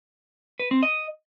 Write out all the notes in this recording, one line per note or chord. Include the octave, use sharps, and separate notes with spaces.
B4
C4
D#5